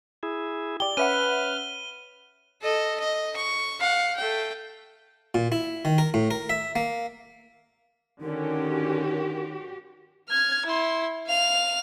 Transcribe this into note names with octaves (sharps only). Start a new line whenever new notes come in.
E4 G#4
G4 D5 G7
C#4 B4 E5 F#5 F6 D#7
A4 D#5
D#5
C#6
F5 F#5
A3 G5
A#2
E4
D#3
A#4
A2
A#4
E5
A#3
D3 D#3 C#4 F#4 G4 A#4
F6 G#6
E4 C6
F5 F7